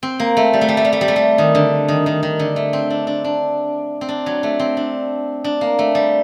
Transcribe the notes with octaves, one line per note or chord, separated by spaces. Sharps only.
C4
A#3
A3
G3
A3
G3
A3
G3
A3
G3
A3
G3
D#3
D3
D#3
D#3
D#3
D3
A3
C4
D4
D4
D4
C4
D4
F#3
A3
C4
D4
D4
A#3
A3
G3